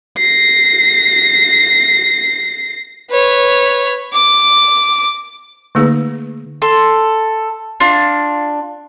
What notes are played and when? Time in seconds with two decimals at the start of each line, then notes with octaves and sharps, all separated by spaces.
0.18 A#6 C7
3.11 B4 C#5
4.13 D6
5.75 D3 A3 A#3 D#4 G#4 B4
6.62 A4 C6
7.80 D4 F4